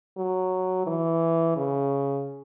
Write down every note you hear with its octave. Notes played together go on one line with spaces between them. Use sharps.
F#3
E3
C#3